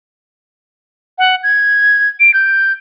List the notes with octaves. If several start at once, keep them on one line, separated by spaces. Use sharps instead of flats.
F#5
G#6
D7
G6